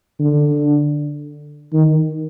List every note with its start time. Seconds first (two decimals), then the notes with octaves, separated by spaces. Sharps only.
0.19 D3
1.73 D#3